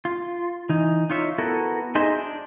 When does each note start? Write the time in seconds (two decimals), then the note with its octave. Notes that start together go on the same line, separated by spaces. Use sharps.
0.05 F4
0.69 E3 D#4
1.10 D#4 F4 C#5 E5
1.38 B3 E4 F#4 A4 A#4
1.95 D#4 G#4 C5 D#5 E5
2.16 D4